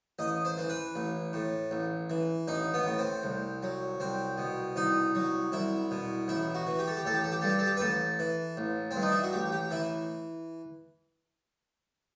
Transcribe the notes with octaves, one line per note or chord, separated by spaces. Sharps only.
A1 D#5
C5
E3
B4
A1
A2
A1
E3
A1 D#4
B3
A2
C4
C2
F#3
C2 C4
B2
C2 D#4
F#3
C2 E4
B2
A1 E4
F#4
E3
G4
A4
G4
A1 A4
G4
A4
G4
G2 A4
G4
A4
G4
B4
A1 A4
E3
A1
G2 C4
D#4
E4
F#4
A1 G4
G4
E3 E4